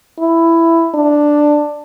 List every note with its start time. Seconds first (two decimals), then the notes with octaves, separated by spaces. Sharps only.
0.19 E4
0.95 D4